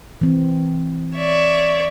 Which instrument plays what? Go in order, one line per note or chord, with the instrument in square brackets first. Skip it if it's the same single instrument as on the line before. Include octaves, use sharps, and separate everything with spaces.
[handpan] E3 C4
[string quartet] C#5 D5 E5